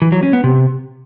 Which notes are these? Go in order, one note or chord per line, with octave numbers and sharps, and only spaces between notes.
E3
F#3
C#4
B3
C3